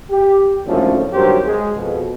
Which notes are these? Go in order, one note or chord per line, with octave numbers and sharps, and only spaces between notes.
G4
G#1 F#2 A2 D3 F3 C#4
G#1 G2 F#3 G4 A#4 C5
G#3
F2 B2